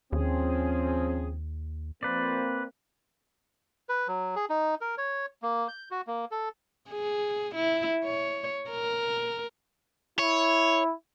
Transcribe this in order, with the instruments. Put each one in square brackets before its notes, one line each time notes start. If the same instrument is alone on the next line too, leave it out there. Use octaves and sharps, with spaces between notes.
[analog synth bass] D#2 [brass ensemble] F3 C4 [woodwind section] C#4 G#4
[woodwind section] F3 C5 [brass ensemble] A#3 C4 [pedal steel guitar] B4 D5
[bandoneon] B4
F#3
G#4
D#4
A#4
C#5
A#3
G6
F#4
A#3
A4
[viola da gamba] G#4
E4
C#5
A#4
[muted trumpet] E4 [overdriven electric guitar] C#5